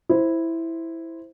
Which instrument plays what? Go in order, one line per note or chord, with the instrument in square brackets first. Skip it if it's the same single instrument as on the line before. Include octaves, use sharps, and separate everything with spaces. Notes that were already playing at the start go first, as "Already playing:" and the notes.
[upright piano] E4 C5